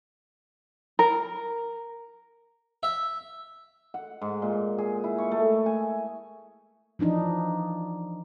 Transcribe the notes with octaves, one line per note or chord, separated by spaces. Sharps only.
A#4
E5
F#5
G#2
A#2
G#4
E4
C#6
A3
G#5
E3 F3 D4 D#4